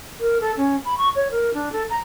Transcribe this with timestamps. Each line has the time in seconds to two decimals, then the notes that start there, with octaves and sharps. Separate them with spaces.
0.20 A#4
0.41 A4
0.57 C#4
0.85 B5
0.98 C#6
1.15 C#5
1.31 A#4
1.54 D4
1.72 A4
1.90 A#5